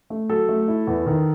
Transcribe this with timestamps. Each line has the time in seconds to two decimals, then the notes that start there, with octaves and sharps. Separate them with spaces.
0.10 A3
0.30 F#3 A4
0.49 A3
0.68 E4
0.87 E2
1.06 D#3